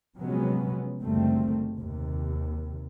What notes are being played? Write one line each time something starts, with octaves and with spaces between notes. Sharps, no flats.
C3 F3 F#3 G#3 B3 C#4
F#1 D2 D#3 G3 A3 C4
D#2 C3